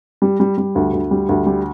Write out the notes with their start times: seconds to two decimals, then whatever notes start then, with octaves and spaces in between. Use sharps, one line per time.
0.22 G3
0.40 G3
0.58 G3
0.75 D2
0.93 D2
1.11 G3
1.29 D2
1.47 G3